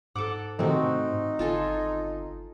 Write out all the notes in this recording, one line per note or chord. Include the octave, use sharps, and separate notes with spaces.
G#2 A4 F#5 D6
A2 C3 D#3 C4 D#4 F#4
G1 F4 A4 G#5